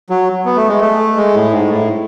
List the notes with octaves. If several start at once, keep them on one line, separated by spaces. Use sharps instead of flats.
F#3
B3
A3
G#3
A3
G#3
A2
G#2
A2